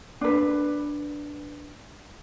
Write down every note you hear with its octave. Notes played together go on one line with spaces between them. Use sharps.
D4 B4